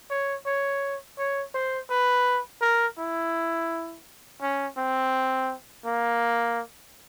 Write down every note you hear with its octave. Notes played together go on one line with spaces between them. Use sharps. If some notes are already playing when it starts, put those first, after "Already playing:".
C#5
C#5
C#5
C5
B4
A#4
E4
C#4
C4
A#3